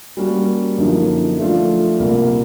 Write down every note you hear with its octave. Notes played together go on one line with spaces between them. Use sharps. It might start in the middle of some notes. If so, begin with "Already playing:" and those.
G3 A#3 C#4 F#4 A#4
F#2 D3 F3 A#3 D#4
F3 A3 D4 F4 A4
C2 A#2 G3 A#3